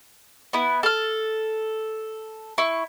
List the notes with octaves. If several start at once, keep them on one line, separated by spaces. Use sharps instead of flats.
B3 E4
A4 F6
E4 C#6